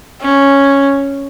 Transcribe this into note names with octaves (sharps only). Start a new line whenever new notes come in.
C#4